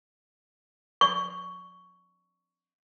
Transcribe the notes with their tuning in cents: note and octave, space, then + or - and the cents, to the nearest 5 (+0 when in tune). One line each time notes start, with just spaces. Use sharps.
C#6 +10